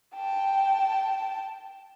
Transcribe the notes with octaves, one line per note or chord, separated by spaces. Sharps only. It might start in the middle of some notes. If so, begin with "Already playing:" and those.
G5 A5